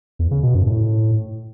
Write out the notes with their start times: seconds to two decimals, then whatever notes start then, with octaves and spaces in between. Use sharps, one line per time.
0.19 E2
0.31 C#3
0.43 B2
0.55 F#2
0.66 A2